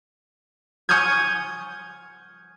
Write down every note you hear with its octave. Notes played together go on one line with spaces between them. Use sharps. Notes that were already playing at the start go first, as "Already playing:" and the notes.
G#5 C#6 D#6 F6 G6 G#6